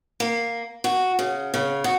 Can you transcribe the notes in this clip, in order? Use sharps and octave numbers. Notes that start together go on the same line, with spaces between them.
A#3
F#4
C#3
C#3
F#4